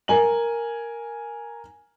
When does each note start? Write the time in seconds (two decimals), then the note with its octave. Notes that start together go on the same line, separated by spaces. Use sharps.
0.08 A#4 G#5 F#7